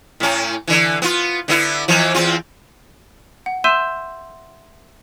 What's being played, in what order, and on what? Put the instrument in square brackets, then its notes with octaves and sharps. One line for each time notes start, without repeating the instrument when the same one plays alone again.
[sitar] A2 C#4
D3 E3
B3 F4
D3 B3 E4
F2 E3 F3
E2 C4 F4
[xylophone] F#5
E5 C6 E6 G6 D#7 E7